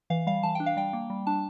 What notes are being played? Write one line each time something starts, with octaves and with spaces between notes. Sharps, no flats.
E3 F5
G3 F5
E3 A5
D4 G5
F5
G3 G5
A#3
G3
D4 A5